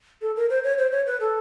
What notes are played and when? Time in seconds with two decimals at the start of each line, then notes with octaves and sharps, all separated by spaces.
0.22 A4
0.36 A#4
0.50 C5
0.64 C#5
0.78 C5
0.92 C#5
1.07 B4
1.20 A4